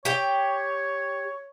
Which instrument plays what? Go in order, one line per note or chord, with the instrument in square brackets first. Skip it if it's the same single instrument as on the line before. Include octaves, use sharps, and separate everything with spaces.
[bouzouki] G4 G5 [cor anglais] C#5